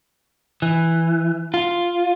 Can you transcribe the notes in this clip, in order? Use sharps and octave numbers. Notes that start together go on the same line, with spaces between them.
E3
F4